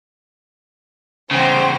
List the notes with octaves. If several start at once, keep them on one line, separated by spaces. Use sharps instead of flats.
E2 C#3 C5 G5 C6